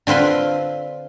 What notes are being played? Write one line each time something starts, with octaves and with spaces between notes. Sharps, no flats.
D3 C4 F4 B4 C6